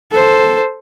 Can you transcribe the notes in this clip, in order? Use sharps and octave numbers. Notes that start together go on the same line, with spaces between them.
A4 C5